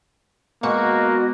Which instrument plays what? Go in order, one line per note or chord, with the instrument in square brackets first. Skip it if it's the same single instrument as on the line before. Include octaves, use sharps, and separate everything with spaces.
[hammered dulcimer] B2 G#3 B5 [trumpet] A#3 [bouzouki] F#4 [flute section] D#5